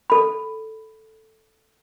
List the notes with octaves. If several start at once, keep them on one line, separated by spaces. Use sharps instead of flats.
A4 B5